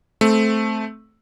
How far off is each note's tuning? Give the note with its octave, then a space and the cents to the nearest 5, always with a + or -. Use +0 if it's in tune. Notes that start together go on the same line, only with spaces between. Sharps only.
A3 -10 C4 +0